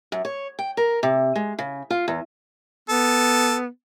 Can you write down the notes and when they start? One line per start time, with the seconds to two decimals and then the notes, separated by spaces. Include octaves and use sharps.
0.12 F#2
0.25 C#5
0.59 G5
0.77 A#4
1.03 C3
1.36 G#3
1.59 C#3
1.90 F4
2.08 E2
2.89 B3 A4